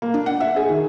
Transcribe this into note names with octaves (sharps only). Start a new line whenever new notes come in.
A#3
D4
F#5
E5
G#4
D#3